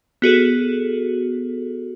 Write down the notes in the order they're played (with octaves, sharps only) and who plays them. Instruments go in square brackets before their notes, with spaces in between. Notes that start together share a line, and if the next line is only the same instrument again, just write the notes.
[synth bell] B3 F#4 G#4 A4